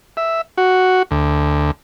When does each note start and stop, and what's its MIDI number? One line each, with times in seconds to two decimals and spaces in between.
0.17 0.41 76
0.58 1.03 66
1.11 1.71 38